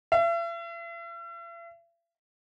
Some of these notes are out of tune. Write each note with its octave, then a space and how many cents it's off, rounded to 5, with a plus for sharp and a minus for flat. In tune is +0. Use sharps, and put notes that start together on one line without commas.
E5 +45